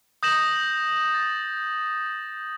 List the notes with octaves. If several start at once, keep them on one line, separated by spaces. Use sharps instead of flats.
D#6 G6 A#6 E7 F#7
A6